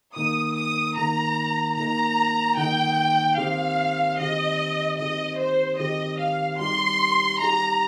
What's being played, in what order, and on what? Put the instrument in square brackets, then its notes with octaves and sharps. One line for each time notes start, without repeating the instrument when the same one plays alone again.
[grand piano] D#3 A#3 D#4 [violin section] D#6
[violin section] D#6
[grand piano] D#3 A#3 D#4 [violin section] A#5
[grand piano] D#3 A#3 D#4 [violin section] A#5
[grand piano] D#3 A#3 D#4 [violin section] G5
[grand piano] D#3 C4 G4 [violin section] F5
[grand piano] D#3 C4 G4 [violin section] D#5
[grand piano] D#3 C4 G4 [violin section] D#5
[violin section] C5
[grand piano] D#3 C4 G4 [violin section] D#5
[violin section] F5
[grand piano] G3 D#4 G4 [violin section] C6
[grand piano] G3 D#4 G4 [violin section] A#5